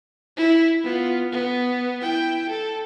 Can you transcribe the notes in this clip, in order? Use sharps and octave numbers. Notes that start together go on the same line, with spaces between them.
E4
B3 F4
B3
E4 G5
A4